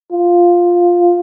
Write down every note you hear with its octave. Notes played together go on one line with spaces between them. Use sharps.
F4